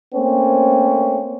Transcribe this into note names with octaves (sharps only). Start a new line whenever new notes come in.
A3 A#3 C4 C#4